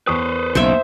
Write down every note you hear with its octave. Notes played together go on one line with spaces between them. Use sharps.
E2 B4 C5 C#6 D#6
B1 C#3 A#3 D#4 C5 E5